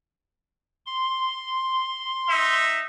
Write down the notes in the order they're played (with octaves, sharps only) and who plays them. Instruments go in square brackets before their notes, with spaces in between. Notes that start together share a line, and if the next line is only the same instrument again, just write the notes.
[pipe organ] C6
[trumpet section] D#4 E5